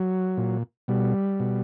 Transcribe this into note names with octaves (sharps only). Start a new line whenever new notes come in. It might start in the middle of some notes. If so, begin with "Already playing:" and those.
Already playing: F#3
A#2
B2 G3
B2